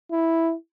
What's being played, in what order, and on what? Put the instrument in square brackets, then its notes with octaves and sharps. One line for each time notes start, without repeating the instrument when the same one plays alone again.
[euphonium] E4